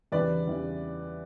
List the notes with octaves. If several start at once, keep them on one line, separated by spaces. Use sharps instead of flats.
E2 C#3 E3 G3 B4 D5
E2 C#3 E3 G3